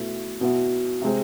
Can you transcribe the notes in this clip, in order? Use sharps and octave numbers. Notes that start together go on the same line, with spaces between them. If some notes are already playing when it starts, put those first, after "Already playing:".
Already playing: B2 A3 E4
B2 B3 E4
C3 G#3 C4